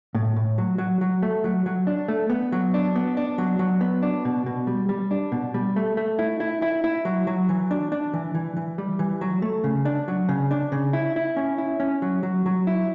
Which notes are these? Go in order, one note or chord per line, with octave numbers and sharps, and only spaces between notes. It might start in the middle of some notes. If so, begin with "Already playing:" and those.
A2
A2
F#3
F#3
F#3
A3
F#3
F#3
D4
A3
B3
F#3
D4
B3
D4
F#3
F#3
B3
D4
B2
B2
G3
G3
D4
B2
G3
A3
A3
E4
E4
E4
E4
F#3
F#3
E3
D4
D4
E3
E3
E3
G3
E3
F#3
A3
C#3
D4
F#3
C#3
D4
C#3
E4
E4
C#4
E4
C#4
F#3
F#3
F#3
E4